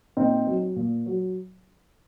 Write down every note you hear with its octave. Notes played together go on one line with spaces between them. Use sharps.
A#2 C4 D#4
F#3
A#2
F#3